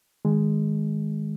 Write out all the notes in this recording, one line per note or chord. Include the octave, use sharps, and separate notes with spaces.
D#3 G#3